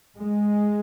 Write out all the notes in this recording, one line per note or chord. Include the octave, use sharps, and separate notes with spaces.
G#3